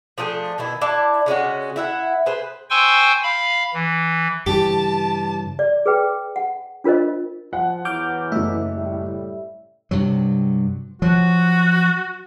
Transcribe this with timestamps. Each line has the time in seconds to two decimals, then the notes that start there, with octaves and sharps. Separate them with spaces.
0.18 F3 A3 D4 G#4
0.58 B2 D#3 E4
0.81 D4 E4 A5
1.26 C#3 G#3 C#4 F#4
1.76 E4 E5 F#5
2.26 G#4 B4 C5
2.70 C5 G5 G#5 C6 C#6 E6
3.23 F5 B5
3.74 E3
4.46 G2 C#3 E3 G4 A5
5.59 D5
5.86 G#4 B4 G5
6.36 F#5
6.84 D4 F4 A#4 C5 D#5
7.53 F3 F#5
7.85 E2 E3 F#3 D6 F6 G6
8.32 F#1 A3 E5
8.76 A2 G3
9.91 G2 C3 F#3
11.02 F3 F#3 F#4